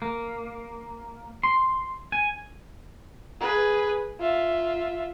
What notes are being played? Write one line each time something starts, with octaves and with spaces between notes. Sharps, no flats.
A#3
C6
G#5
G#4 B4
F4 E5